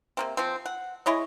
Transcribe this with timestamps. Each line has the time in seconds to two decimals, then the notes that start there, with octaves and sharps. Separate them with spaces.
0.17 C3 A#3 C4
0.37 F3 C4
0.66 F#5
1.06 G#3 E4 C#5 D#5